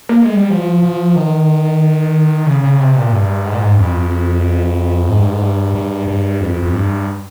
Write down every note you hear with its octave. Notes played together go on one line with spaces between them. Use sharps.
A#3
G#3
G3
F3
F3
D#3
C#3
C#3
C3
A#2
G2
G#2
A#2
G#2
G2
F2
G#2
G2
G#2
G2
G2
G2
F2
F2
G2